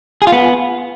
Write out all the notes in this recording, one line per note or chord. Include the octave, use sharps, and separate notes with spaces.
G#4
F4
B3